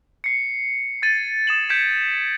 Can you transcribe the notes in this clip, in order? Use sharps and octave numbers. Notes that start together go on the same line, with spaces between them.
C7 C#7
G#6 A6 D#7
D#6 E7 F#7
G6 G#6 B6 C#7 D7 E7